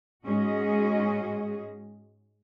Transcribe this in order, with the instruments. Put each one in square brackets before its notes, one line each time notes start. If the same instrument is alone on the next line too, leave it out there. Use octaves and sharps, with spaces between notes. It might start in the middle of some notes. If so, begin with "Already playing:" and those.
[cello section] G#2 G#3 C#4 F#4 G#4 D#5